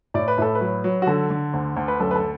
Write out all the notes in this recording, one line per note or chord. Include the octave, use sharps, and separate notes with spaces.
A2 D5
B4
A2 A4
B4
F#3
F#3
F#4
D3 A4
D3
D2
D2
B4
F#2 A4
B4
A4